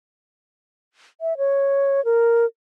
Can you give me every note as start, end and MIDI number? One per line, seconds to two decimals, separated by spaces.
1.21 1.37 76
1.38 2.03 73
2.05 2.45 70